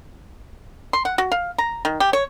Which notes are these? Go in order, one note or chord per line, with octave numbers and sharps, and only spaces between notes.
C6
F#5
F#4
F5
A#5
D#3
G4
C#5